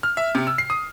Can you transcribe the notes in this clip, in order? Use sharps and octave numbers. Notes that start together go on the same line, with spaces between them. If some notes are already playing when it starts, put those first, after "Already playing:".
F6
E5
C3
E6
C7
D#6